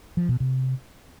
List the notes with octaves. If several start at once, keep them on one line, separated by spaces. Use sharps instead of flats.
F3
B2
C3